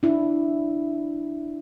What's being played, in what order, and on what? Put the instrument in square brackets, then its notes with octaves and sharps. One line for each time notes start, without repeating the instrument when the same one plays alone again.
[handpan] D4 E4